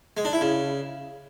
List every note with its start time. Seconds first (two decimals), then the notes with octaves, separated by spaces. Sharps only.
0.17 G#3
0.25 D4
0.33 E4
0.41 C#3